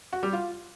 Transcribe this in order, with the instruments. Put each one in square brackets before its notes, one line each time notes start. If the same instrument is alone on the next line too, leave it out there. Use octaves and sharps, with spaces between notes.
[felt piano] F#4
G3
F4